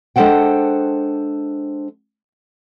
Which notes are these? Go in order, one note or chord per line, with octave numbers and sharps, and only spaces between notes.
G#3 D4 A4 C5 F#5 G5